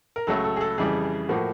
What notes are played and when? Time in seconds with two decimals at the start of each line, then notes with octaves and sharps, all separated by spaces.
0.16 A#4
0.27 C#2 C#3 F#3 A3 A4
0.44 A4
0.56 G#4
0.61 A4
0.78 F2 C#3 E3 G3 G#4
1.29 A2 F3 A#3 F#4